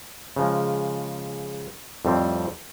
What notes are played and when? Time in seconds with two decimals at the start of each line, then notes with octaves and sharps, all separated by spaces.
0.36 C#3 F3 G#3
2.05 F2 A2 G3 C4